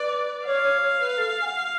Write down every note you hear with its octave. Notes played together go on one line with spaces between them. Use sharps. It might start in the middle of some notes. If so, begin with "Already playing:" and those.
Already playing: B4 D5
C#5 F5
C#5
C#5
B4
A4
G#5
F#5